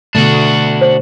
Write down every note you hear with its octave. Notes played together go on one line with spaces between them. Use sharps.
B2 D3 A3 D4 F#4
C5